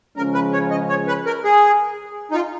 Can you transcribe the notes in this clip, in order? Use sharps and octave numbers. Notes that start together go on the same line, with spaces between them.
C#3 F3 G#3 C#4 A#4
B4
C#5
D#5
C#5
B4
A#4
G#4
D#4
F4